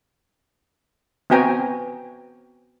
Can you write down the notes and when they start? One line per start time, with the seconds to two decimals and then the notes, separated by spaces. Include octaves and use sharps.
1.30 B3 C4 F#4 G5 G#5 A#5